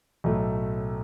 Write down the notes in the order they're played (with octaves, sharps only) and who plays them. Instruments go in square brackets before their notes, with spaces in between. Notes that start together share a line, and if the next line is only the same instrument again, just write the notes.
[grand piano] B1 A2 F#3 A3